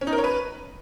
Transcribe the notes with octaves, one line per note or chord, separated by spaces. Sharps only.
C#4
D#4
A#4
C#5
B4